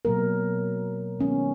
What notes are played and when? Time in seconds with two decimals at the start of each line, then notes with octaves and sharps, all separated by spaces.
0.05 B2 F#3 A#3 A#4
1.19 D#3 G#3 B3 C#4